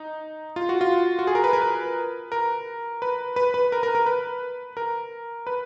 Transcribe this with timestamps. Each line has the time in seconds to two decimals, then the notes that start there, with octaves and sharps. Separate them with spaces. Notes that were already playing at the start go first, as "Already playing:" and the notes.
Already playing: D#4
0.56 F4
0.69 F#4
0.81 F4
1.19 F#4
1.27 G#4
1.35 A#4
1.44 B4
1.53 A#4
1.62 B4
2.32 A#4
3.02 B4
3.36 B4
3.54 B4
3.72 A#4
3.83 A#4
3.95 A#4
4.06 B4
4.77 A#4
5.47 B4